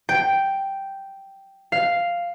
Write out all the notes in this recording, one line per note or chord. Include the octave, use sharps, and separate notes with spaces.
G5
F5